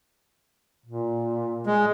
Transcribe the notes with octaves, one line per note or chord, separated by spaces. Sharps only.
A#2
G#3